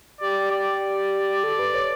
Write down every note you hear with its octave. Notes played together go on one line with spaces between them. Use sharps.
G4 D5
D5
A4
B4
C#5